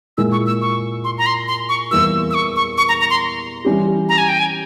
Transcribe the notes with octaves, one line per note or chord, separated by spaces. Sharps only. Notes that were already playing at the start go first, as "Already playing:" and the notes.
A#2 G#3 E4 A#4 E6
C#6
E6
C#6
C6
A#5
C6
C6
C#6
E2 E3 G3 A#3 E6
E6
C#6
C#6
C#6
A#5
A#5
C6
E3 G3 C#4 G4
A#5
G#5
G5
G#5